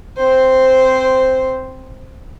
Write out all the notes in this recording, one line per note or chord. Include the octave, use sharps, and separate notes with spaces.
C4 C5